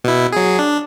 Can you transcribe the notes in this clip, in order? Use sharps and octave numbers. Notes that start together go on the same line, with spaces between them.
B2 E4
F#3 G#4
D4